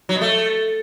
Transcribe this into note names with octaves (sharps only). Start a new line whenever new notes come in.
F#3
B2
A3